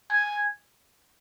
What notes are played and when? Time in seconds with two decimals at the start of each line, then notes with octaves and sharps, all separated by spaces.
0.11 G#5